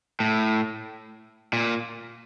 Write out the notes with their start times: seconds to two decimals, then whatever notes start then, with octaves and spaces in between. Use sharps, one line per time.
0.20 A2
1.53 A#2